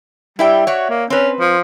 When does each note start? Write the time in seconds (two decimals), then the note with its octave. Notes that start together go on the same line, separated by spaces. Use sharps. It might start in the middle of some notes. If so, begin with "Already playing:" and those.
0.39 G3 E4 E5 G5
0.67 F#4 C#5 D5 E5
0.90 A#3
1.10 C4 C#4 B4
1.40 F3